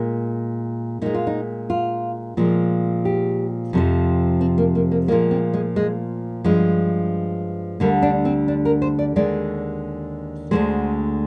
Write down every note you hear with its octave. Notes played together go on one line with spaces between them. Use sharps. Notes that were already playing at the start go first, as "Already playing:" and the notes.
Already playing: A#2 G#3
A#2 G#3 D#4
F4
D#4
F4
A#2 F3 G#3
G4
F2 C3 F3
C4
A#3
A#3
A#3
A#2 F3 G#3 A#3
C4
G#3
G#3
G2 F3 G#3
D2 D3 G3 A#3
D4
C4
D4
A#4
C5
D5
D#2 D3 G#3 D5
D2 D3 F3 G#3 C5